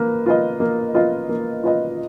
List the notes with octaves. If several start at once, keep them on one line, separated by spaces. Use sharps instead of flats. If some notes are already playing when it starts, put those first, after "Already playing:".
Already playing: A#3 B4
F4 B4 D#5
A#3
F4 B4 D#5
A#3
F4 B4 D#5